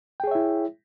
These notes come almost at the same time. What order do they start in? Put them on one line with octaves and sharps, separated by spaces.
G5 G#4 C#5 E5 E4